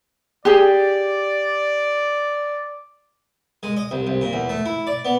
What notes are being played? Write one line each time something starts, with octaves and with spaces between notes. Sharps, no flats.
G4 G#4 D5
G#3
D#5
C2
C2
A#2
E2
A3
E4
D5
B3